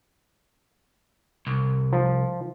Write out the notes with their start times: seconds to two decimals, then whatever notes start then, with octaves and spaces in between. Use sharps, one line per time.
1.47 C2
1.93 F3